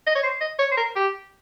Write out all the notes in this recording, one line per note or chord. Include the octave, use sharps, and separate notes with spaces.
D#5
C#5
C5
D#5
C#5
C5
A#4
G4